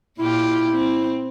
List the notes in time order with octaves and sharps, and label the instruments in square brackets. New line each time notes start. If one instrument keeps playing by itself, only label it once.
[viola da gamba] A#2 F4 G4 [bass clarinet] E4
[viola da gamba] C4